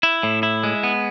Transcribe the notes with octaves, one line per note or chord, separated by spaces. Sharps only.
E4
A2
E4
G#3
B3